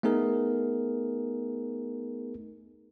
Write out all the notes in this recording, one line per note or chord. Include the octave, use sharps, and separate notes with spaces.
A3 B3 D#4 G#4 A#4